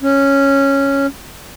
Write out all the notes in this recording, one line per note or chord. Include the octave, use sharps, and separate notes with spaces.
C#4